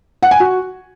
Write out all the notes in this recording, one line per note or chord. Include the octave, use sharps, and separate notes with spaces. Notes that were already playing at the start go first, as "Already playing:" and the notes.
F#5
G#5
F#4